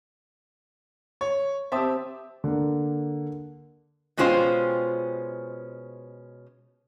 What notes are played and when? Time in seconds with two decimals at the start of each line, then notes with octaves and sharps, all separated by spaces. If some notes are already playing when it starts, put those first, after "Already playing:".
1.21 C#5
1.72 C4 G4 E5 A5 D#6
2.44 D3 A#3
4.17 B2 G#3 C#4 F4 C5 G5